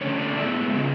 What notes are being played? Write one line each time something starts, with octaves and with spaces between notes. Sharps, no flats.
D3 A3 C#4 C#5
D5
A2 G#3 B3 E5
C#3 G#3 C#4